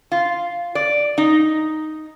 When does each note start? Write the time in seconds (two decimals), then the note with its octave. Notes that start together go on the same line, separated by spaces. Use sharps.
0.12 F4
0.75 D5
1.18 D#4